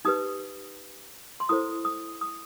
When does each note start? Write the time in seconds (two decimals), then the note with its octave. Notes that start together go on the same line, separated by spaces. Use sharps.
0.05 D#4 G4 B4 D#6
1.40 C6
1.49 E4 A4 C5 D#6
1.85 D#6
2.21 D#6